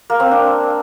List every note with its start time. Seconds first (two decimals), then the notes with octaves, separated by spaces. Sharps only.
0.10 A#3
0.20 C4
0.31 D4